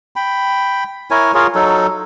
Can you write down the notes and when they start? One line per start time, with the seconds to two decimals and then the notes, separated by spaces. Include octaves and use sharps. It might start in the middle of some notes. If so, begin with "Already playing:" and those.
0.16 G5 B5
1.11 E4 A#4 C#5 G#5
1.34 F4 G#4 A#4 C#5
1.55 F#3 D#4 A4